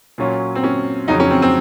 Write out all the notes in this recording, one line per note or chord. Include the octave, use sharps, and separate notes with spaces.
A#2 F#3 C#4 F4
C4
C#4
F2 C#3 F#3 D#4
C#4
C4
C4